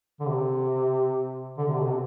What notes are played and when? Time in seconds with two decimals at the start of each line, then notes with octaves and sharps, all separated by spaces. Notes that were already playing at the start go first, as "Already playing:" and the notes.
0.20 D3
0.28 C3
1.58 D3
1.68 C3
1.79 B2
1.84 C3